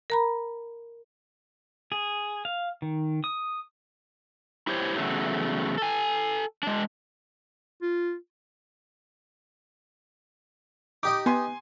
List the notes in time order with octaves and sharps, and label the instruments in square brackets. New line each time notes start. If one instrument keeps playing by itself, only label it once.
[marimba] A#4 A#5 B5
[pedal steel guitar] G#4
F5
D#3
D#6
[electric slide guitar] E4 G4 C5 C#5
E2 C#3 F#3 A3
A4 G#5
G#3 D4
[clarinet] F4
[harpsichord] D#4 G4 D#5 [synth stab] D6
[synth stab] B3 [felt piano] G#5 C6